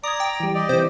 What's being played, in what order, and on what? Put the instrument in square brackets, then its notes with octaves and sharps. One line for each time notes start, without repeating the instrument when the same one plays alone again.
[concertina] D5 A#5 [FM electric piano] D6 G#6 [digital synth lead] D#6
[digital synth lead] G5
[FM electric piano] E3 G3
[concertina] G4 D5 D#5
[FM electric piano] C3 E3 [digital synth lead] C5